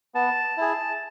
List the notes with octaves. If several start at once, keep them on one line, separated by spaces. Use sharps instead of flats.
B3 A5
E4 G#4